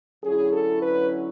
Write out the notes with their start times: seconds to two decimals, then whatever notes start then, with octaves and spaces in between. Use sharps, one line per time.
0.23 D3 F#3 C#4 E4 G#4
0.52 A4
0.82 B4